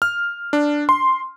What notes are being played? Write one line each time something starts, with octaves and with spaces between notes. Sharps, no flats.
F6
D4
C6